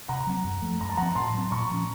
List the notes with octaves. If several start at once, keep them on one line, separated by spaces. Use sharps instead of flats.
C3 F#5 A#5
F#3 C4
F#2
F3 A3
F#2 A#5
A5
F3 C4 F#5 A#5
A2 A5 C6
F#3 C4
A#2 A#5 C#6
F3 A#3 C#4